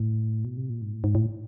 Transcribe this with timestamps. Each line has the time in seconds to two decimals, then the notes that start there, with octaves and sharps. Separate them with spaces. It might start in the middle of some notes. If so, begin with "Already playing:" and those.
Already playing: A2
0.45 B2
0.57 C3
0.70 A#2
0.82 G#2
0.93 A2
1.04 G#2
1.15 A2